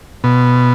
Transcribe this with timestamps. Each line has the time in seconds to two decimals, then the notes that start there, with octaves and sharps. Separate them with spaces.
0.24 B2